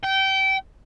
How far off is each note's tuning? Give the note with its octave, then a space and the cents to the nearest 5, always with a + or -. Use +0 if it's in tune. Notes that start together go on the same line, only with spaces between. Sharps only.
G5 -25